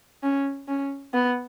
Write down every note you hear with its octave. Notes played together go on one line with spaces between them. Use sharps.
C#4
C#4
B3